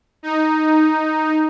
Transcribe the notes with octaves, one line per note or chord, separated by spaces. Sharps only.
D#4